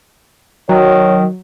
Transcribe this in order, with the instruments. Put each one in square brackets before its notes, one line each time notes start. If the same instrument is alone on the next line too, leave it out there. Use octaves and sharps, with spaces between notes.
[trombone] D#3 [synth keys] F#3 [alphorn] C#5